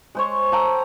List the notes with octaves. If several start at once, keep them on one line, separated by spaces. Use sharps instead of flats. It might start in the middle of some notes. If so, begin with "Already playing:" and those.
G#3 C5 C#5
A4 G5 A#5